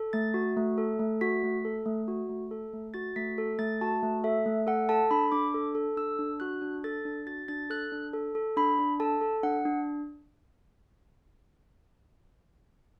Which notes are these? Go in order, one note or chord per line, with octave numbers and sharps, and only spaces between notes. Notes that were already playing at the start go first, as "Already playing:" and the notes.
Already playing: A4
A3 A6
F#4
A3
A4
A3
F#4 B6
A3
A4
A3
F#4
A3
A4
A3
F#4 A6
A3 B6
A4
A3 A6
F#4 A5
A3
A4 E5
A3
A4 F#5
A4 A5
D4 B5
D4 D6
A4
A4
D4 E6
D4
F#4 F#6
D4
A4 A6
D4
F#4 A6
D4 A6
A4 F#6
D4
A4
A4
D4 B5
D4
A4 A5
A4
D4 F#5
D4